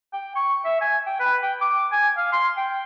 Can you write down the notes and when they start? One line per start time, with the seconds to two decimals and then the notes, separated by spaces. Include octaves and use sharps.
0.13 G5
0.36 C#6
0.65 E5
0.81 G#5
1.06 G5
1.20 B4
1.42 G5
1.61 D6
1.92 G#5
2.17 F5
2.32 C6
2.57 G5